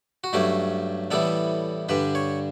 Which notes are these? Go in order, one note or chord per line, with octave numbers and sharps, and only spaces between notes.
F#4
G2 F#3 A3 C#4 G4
A2 E3 G3 B3 A4
G2 D3 G3 B4
C#5